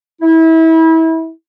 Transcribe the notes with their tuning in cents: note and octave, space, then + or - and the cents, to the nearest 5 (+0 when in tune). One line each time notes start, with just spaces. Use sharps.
E4 -30